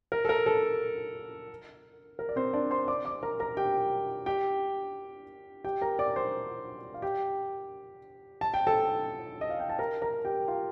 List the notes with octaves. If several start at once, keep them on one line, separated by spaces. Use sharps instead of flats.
A#4
A4
A#4
A4
A#4
D5
C4 C5
D4 D5
C5 C6
D5 D6
D5 D6
A#4 A#5
A#4 A#5
G4 G5
G4 G5
G4 G5
A#4 A#5
D5 D6
C5 C6
F5
G4 G5
A5
G5
A4 A5
D#5
F5
G5
A5
A#4 A#5
A#4 A#5
G4 G5
F4 F5